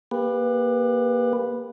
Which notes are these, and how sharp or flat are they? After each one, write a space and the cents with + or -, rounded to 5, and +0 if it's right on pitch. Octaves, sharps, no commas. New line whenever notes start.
A#3 +15 G4 +30 B4 +0